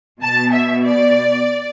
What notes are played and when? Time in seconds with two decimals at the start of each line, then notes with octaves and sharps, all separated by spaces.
0.21 B2 A5
0.53 E5
0.85 D5